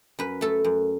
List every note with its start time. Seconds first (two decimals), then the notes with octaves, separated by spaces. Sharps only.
0.19 F#2 B4
0.41 A3 A4
0.64 F#2